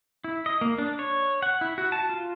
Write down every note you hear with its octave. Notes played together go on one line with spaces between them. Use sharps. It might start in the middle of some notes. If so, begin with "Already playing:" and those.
E4
D#5
A#3
D4
C#5
F#5
E4
F#4
A5
F4